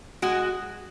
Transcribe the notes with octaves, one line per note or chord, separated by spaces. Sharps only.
G#3 F#4